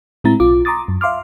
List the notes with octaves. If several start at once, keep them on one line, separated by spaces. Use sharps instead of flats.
A2 G#3 C4 E4 A#5 A6
B1 F4 D6
A#5 C6 D6 D#6 A6
F#2
E5 F5 C6 D6 F6